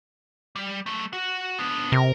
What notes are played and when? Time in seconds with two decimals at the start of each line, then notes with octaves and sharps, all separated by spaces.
0.56 G3
0.86 F#3 A3
1.13 F#4 F#5
1.59 B3 D4
1.92 C3 A#4